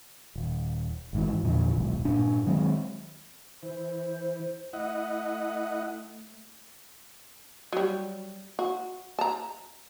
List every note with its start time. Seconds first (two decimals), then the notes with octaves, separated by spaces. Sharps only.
0.36 D#1
1.13 G#1 G#2 E3
1.43 E2 A#2 D3 F3
1.77 D#1 B1 G#2
2.05 G2 A#2 D4
2.46 D#3 F#3 G#3 C4
3.63 E3 C5
4.73 A3 E4 D#5 F#5
7.73 F#3 G3
8.59 F#4
9.19 A5 A#5